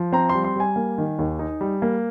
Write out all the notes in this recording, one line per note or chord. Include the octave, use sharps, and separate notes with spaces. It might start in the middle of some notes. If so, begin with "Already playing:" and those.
Already playing: F3
C4 A#5
G3 C6
C6
G3 G#5
A#3
D#3
D#2
D#4
G3
A#3